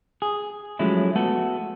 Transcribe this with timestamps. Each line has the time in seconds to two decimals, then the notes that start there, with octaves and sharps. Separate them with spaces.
0.22 G#4
0.79 F3 F#3 G#3 A3 C#4 E4
1.16 A3 B3 F#4 A4